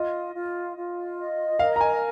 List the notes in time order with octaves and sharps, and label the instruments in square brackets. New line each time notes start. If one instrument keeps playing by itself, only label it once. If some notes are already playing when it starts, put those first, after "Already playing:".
Already playing: [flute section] F4 [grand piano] D#5
[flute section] F4
F4
D#5
[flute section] A#4 [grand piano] F5
[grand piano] A#5
G#5